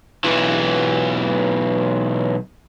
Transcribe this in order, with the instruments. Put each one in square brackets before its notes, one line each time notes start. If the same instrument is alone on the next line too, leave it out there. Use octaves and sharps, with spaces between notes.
[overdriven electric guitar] B1 E3